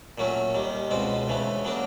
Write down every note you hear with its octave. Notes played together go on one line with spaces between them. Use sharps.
A#2 F#3 A3 C#4
D#2 D#3 G3
C#2 B2 G#3 C4
D2 C#3 E3 A3
C#3 F#3 A#3 D4